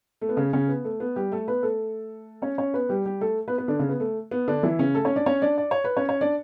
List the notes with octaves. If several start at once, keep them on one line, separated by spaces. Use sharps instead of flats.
A3
B3
C#3 C#4
C#3 C#4
B3
A3
B3
G3 G4
A3 A4
B3 B4
A3 A4
C#4 C#5
C#4 C#5
B3 B4
G3 G4
G3 G4
A3 A4
B3 B4
B3 B4
D3 D4
C#3 C#4
B3
A3
B3
D3 D4
E3 E4
C#3 C#4
A3 A4
C#4 C#5
D4 D5
C#4 C#5
D4 D5
D5
C#5
B4
C#4 C#5
C#5
D4 D5